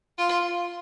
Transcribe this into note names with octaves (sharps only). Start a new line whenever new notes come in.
F4